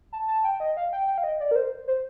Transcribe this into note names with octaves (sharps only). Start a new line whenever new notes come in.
A5
A5
G5
D#5
F5
G5
G5
F5
D#5
D5
A#4
C5
C5